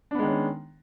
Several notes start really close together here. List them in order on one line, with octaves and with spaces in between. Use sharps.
D4 B3 G#3 D#3 C#4